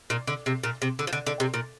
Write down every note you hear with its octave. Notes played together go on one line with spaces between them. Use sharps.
A#2
D3
C3
A#2
C3
D3
F3
D3
D3
C3
A#2